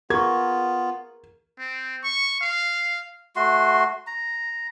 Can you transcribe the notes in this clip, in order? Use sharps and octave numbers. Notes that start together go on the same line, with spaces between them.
B3 F4 G#4 A#4 C#6 G#6
C4
C#6
F5
A3 F#4 C6
A#5